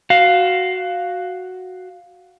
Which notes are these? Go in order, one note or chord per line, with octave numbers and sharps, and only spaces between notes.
F#4 F5